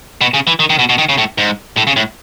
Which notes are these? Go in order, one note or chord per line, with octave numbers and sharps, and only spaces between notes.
B2
C#3
E3
D#3
D#3
B2
B2
D#3
C#3
A2
G#2
A2
C#3
A2